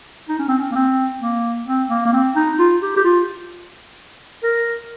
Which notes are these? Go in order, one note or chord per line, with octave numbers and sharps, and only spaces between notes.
D#4
C#4
C4
C#4
A#3
C4
A#3
C4
A#3
A#3
C4
D#4
F4
G4
G4
F4
A#4